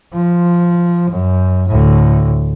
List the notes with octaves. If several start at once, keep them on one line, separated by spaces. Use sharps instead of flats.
F3
F#2
D2 A2